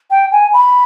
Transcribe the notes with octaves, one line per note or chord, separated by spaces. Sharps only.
G5
G#5
B5